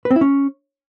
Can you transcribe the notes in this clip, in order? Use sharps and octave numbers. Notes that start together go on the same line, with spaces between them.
B4
C4
E4
C#4